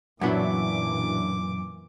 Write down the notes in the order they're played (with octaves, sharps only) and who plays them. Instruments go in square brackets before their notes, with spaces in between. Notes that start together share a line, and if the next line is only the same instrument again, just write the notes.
[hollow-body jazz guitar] F#2 B3 [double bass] A#2 E3 [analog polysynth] F#3 D4 E4 [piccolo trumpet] D6